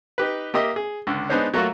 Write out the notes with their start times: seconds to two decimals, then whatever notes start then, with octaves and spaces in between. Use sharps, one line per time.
0.18 D#4 G4 B4
0.54 A#3 G4 D#5 E5
0.76 G#4
1.07 C#2 D3
1.30 G#3 B3 D4 D#4 C5 C#5
1.54 F#3 A3 A#3 F4 F#4